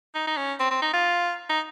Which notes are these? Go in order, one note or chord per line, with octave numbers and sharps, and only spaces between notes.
D#4
D#4
C#4
C4
C4
D#4
F4
D#4